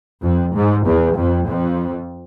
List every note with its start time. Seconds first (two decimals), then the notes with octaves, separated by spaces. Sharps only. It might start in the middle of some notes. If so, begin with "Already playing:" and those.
0.23 F2
0.54 G#2
0.86 E2
1.17 F2
1.48 F2